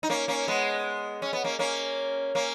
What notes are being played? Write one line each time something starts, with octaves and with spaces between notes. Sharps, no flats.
D#4
A#3 C#4
A#3 C#4
G#3 B3
C#4
B3
A#3 C#4
A#3 C#4
A#3 C#4